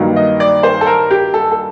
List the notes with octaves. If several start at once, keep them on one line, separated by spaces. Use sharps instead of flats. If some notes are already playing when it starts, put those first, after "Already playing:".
Already playing: G2 D#3 F#3 A#3
D#5
D5
C5
A4
A#4
G4
A4
A4